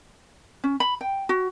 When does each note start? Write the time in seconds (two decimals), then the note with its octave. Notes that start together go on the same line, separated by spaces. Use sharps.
0.64 C#4
0.80 B5
1.01 G5
1.29 F#4